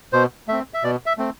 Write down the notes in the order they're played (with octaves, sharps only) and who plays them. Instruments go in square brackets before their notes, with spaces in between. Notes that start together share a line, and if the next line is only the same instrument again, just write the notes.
[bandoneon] B2 C5
A3 C4 E5
E5
B2 D5
E5
A3 C4